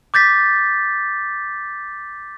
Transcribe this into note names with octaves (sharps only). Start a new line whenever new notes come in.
D6 G6 A6 B6